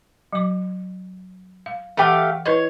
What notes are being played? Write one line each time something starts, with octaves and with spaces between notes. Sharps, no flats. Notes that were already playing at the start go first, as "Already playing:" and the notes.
F#3 D6
F5
E3 A3 G4 F5 F#5
E4 B4 C#5 D#5